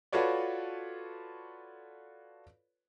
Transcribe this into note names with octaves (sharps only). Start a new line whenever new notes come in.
F4 F#4 A4 B4 C#5 D5